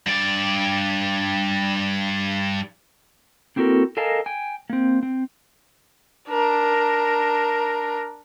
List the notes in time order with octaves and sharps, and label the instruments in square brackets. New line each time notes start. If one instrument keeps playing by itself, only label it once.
[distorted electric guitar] G2 D5
[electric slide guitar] A#3 C4 E4 F#4 A4 A#4
A4 A#4 D#5 F5 G#5 A5
G5 G#5
A#3 C4
C4
[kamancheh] D4 A#4